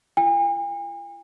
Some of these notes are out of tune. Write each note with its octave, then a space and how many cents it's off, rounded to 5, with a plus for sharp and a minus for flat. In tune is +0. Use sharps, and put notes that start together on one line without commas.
F4 -45 G#5 -45